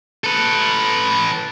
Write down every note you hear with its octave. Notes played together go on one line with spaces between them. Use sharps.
A4 B4